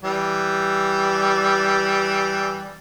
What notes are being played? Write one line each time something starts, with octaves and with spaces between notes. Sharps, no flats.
E3 G3